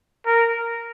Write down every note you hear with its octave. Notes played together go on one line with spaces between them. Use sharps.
A#4